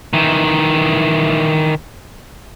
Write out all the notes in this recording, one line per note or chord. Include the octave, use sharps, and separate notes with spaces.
D#3 E3